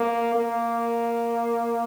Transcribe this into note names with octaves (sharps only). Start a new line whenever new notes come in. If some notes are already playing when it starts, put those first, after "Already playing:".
Already playing: A#3
A#3